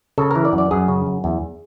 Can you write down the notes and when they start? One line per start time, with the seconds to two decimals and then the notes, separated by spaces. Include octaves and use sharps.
0.18 C#3 A4
0.31 E3 A#4
0.45 D5
0.53 F#2
0.58 D5
0.71 F#2 G#4
0.88 C#3
1.07 F#2
1.24 E2